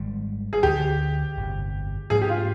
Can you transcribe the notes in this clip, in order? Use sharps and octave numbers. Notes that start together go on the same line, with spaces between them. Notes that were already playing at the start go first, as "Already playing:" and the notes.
Already playing: G#1 G#2 D#3 G3
G#4
D2 D3 F3 G4
G1 F2 C3
G#2 F3 A#3 D4 G#4
G4
F4